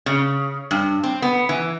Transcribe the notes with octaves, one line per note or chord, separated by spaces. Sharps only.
C#3
G2
C4
B3
E3